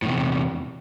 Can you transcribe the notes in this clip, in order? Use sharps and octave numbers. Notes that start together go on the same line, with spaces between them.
E2 A2 C3